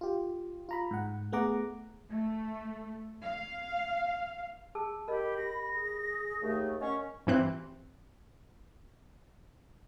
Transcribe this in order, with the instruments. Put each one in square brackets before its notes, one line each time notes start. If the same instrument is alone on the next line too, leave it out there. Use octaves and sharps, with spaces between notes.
[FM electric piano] F4 G4
F4 A#5 B5
G#2 F#5
A3 B3 G#4 F#5 A#5 D6
[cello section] A3
F5
[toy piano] G#4 A5 E6
[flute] G4 [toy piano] A#4 D#5 [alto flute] B5
[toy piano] G4 [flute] A#6
[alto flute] G#4
[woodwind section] D#2 A3
[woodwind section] C#4 [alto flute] A#4 [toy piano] D#5 F#5 [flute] C#6
[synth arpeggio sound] G2 E3 C4 F#6